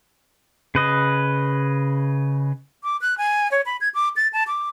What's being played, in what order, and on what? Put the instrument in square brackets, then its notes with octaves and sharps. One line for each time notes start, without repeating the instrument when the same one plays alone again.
[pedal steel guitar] C#3 B4 D#5
[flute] D6
F#6
G#5
C#5
B5
G#6
D6
A6
A5
D6